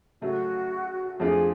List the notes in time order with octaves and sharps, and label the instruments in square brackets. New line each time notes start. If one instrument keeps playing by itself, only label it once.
[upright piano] C#3 F#3 A3 [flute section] F#4
[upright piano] F2 F3 A3 D4 F4 [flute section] G#4